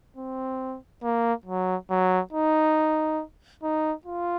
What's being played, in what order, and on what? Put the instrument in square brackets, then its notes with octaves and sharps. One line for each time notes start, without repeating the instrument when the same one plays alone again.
[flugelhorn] C4
A#3
F#3
F#3
D#4
D#4
F4